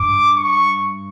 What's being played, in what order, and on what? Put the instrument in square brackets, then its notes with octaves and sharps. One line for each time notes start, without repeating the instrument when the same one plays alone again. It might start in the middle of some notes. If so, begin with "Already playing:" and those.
Already playing: [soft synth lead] G2 [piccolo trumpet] D6
[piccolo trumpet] C#6